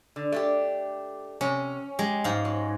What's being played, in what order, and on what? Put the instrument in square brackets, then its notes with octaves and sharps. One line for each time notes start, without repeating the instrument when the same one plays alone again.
[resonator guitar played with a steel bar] D3
A3 D4 G4
[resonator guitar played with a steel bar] C3 [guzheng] C#4
[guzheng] G#3 [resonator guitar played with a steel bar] G4
[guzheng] G#2 F5
[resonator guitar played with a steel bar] F#3